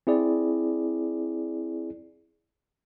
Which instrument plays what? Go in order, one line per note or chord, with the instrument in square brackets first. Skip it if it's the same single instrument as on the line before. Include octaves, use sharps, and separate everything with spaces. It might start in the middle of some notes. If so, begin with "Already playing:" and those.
[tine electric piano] C4 E4 G#4 D5